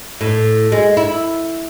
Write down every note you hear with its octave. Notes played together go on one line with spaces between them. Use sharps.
A2
G#3
E4